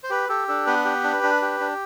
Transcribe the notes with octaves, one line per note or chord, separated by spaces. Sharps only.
C5
G4 B4
G4 A4
D4 A4
B3 B4
G4
D4
D4
G4
D4